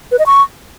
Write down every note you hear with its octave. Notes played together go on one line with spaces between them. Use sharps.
B4
D#5
C#6